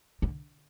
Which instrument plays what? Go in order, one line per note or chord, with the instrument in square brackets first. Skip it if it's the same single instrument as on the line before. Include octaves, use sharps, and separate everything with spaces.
[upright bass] D3